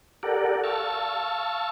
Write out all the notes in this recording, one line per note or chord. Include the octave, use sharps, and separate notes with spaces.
G4 A4 A#4 D5 F#5
F5 A5 C#6 E6